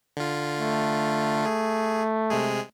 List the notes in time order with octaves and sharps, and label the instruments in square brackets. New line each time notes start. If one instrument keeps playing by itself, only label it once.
[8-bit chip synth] D3 F4
[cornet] A3
[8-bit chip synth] G#4
C3 G#3 G#4